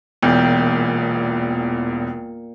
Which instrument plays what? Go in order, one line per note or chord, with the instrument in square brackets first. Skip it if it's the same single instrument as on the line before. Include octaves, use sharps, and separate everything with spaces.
[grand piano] E1 E2 [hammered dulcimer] A#2 G5